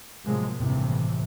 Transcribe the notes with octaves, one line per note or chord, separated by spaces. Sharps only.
A2 C3 F3 F#3 G#3 A#3
G1 D#2 A2 C3 E3